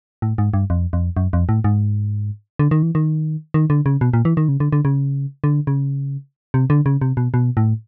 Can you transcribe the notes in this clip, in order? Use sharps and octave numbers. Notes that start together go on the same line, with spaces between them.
A2
G#2
G2
F2
F2
F#2
F2
A2
G#2
D3
D#3
E3
D#3
D#3
D3
C#3
B2
A#2
E3
D#3
C#3
D3
D3
C#3
D3
C#3
C3
D3
C#3
C3
B2
B2
A2